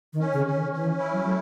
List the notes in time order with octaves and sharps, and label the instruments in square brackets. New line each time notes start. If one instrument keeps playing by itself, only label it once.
[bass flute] D#3
[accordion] C#4
[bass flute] C#3
[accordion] C#4
[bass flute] D#3
[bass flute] E3 [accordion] C#4
[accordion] E4
[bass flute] F#3
[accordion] A3